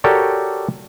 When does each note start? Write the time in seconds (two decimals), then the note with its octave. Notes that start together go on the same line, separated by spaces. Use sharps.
0.04 F#4 G4 A4 A#4 C#5 D5